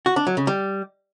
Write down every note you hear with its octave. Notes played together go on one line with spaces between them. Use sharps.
F#4
D4
F#3
C#3
G3